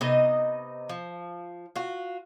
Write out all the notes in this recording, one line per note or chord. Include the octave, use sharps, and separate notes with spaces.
C3 B3 D#4 D#5
F3
F4 F#4